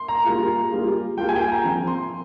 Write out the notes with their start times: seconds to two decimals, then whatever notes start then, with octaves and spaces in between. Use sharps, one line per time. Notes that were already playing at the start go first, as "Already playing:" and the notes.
Already playing: C6
0.08 A#5
0.25 G3 A#3 F4 G#4
0.71 G3 A#3 F4 G#4
1.17 G3 A#3 F4 G#4 G5
1.29 G#5
1.35 G5
1.41 G#5
1.52 A#5
1.64 F3 C4 F4
1.87 C6